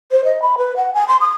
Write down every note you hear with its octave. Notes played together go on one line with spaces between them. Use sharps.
C5
D#5
B5
B4
F#5
G#5
C6
D#6